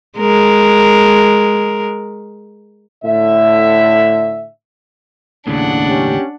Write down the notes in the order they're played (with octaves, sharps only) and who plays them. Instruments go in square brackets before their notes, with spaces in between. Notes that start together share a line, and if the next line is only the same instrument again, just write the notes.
[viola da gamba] G#3 A#4
[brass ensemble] A2 D3 E5
[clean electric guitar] D#2 A2 C#3 [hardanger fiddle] D4 F#5
[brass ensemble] C#4 G4